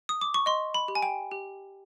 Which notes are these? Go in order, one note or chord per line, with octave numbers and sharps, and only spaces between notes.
D#6
D6
C#6
D#5 C6
B5
G4
G#5
G5
G4